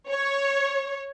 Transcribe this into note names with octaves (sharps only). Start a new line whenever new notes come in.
C#5